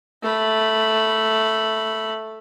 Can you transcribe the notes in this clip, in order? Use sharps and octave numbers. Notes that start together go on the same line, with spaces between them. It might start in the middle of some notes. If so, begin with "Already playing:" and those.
A3 B5